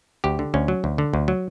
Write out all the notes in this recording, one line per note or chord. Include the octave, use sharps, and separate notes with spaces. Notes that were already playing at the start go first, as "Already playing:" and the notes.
D2 G4
D3
D2 C#4
F#3
D2
D3
D2
F#3